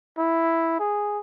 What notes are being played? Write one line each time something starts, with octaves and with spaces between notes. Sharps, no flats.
E4
G#4